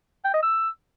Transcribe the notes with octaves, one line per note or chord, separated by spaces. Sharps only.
G5
D#5
E6